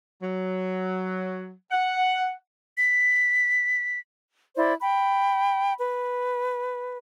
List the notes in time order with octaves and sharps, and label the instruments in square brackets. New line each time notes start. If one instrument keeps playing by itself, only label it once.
[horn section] F#3
F#5
[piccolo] B6
[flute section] E4 C5 D5
G5 B5
B4